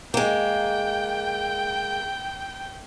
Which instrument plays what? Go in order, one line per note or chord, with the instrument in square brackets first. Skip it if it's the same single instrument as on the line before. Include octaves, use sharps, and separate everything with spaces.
[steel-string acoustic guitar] G#3 A#3 [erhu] G5